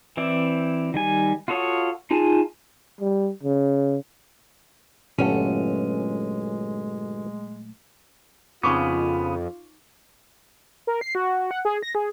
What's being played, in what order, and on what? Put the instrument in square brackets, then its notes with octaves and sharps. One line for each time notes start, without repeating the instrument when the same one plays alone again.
[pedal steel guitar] E3 C4 E4 D5
D#3 G3 G#5
F4 F#4 A4 C#5 D#6
D#4 F4 G#4 G#5 A5
[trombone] G3
C#3
[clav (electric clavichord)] G1 A4 B4 [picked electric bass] A#2 F#3 A3 [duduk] G#3 [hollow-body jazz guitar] C#4
[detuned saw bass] F2 [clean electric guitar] C#3 B3 [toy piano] D#4 C#6 D6 [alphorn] F4
[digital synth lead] A#4
C7
F#4
F#5
G#4
A#6
G#4